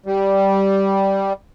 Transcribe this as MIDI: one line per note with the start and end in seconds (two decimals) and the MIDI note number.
0.06 1.33 55